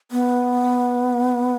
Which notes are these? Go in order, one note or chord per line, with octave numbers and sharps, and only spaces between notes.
B3